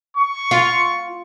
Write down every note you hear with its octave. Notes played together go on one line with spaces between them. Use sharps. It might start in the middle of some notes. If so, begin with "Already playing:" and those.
C#6
F4